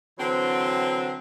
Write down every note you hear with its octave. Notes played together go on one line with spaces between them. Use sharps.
D3 E3 F#3 C4